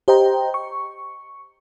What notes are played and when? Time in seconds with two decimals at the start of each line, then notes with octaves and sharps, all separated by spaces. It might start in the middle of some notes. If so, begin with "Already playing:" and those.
0.08 G4 C5 D#5 G5 A#5
0.54 C#6